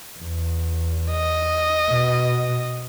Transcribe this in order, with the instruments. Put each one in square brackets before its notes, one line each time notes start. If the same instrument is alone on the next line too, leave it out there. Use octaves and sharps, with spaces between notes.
[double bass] E2
[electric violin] D#5
[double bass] B2